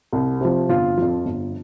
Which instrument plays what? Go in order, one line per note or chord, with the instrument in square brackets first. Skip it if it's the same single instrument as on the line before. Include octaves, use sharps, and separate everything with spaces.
[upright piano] C2
C3 F3
G1 F4
F2 F3
G1